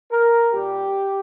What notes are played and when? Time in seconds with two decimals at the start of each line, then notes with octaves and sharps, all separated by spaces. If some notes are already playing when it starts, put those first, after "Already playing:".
0.10 A#4
0.53 A#2 G3 G4